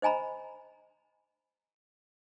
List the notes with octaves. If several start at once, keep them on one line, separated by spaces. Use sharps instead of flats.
C5 D#5 G#5 A#5 B5